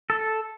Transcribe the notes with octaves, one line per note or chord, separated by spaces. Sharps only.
A4